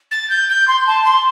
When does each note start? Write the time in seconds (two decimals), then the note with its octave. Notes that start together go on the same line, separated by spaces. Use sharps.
0.11 A6
0.30 G6
0.49 G6
0.68 C6
0.87 A5
1.05 C6